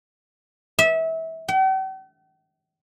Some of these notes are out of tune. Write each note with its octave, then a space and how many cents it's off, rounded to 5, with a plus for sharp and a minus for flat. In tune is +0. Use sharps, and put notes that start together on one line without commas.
E5 -25
G5 -45